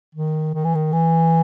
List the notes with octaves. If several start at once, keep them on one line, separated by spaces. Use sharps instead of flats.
D#3
D#3
E3
D#3
E3